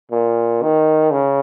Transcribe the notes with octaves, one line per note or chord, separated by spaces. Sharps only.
A#2
D#3
C#3